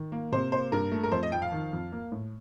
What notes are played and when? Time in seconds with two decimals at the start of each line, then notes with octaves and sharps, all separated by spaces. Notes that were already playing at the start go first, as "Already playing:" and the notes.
Already playing: D#3
0.12 A#3
0.32 C3 C5
0.52 A#3 C5
0.72 G2 A#4
0.92 A3
1.03 A#4
1.12 F2 C5
1.23 D#5
1.32 F3 G5
1.42 F5
1.52 D#3
1.73 F2
1.92 A#3
2.12 A2